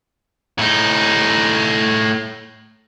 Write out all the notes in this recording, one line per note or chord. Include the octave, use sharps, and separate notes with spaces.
A2 D#4